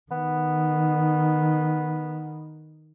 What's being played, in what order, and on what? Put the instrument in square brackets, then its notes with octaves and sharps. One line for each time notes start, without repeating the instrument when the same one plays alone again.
[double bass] D#3 [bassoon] B3